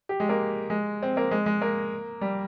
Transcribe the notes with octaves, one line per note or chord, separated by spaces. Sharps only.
G4
G#3
A#3
G#3
C4
A#3
G#3
G#3
A#3
G3